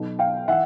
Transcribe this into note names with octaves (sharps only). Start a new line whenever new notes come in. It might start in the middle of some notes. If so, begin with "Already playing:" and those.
Already playing: B1 B2
F5 G5
E3 E5 F#5